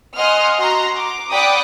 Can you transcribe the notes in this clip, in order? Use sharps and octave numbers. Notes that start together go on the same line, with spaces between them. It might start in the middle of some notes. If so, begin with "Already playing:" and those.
D#5 F#5 G#5 C6 D#6 F6
F#4 A#5 C6
D6
D5 F#5 G5 B5 D6 D#6